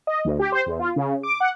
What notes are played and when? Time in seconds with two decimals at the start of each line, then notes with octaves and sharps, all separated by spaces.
0.07 D#5
0.25 D2
0.39 G4
0.52 C5
0.66 E2
0.79 F4
0.96 C#3
1.23 D6
1.40 F#5